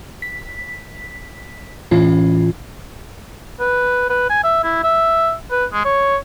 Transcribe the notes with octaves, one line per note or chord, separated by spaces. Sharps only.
B6
A2 E3 C#4 F4
B4
B4
G#5
E5
E4
E5
B4
G#3
C#5